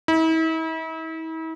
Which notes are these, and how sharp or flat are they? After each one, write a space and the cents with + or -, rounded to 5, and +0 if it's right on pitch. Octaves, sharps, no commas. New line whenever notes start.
E4 -40